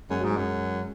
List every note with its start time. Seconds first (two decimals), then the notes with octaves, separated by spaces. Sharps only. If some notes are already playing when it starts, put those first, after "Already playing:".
0.10 F#2 G#3
0.20 F#3
0.24 G#2
0.30 G#3
0.37 F#2